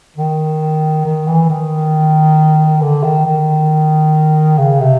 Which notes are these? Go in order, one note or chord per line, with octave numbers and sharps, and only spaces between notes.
D#3
D#3
E3
D#3
D3
D#3
D#3
C#3
C3